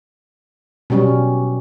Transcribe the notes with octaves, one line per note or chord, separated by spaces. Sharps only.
B2 F#3 G3 C#4